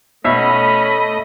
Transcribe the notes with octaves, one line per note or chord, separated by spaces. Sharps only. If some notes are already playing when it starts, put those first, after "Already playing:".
B2 A3 C#4 D#5 E5 B5